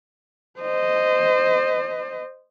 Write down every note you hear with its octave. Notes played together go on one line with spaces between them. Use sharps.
C5 D#5